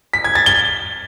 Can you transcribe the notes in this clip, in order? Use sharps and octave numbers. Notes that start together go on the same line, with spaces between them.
B6
G#6
A6
G7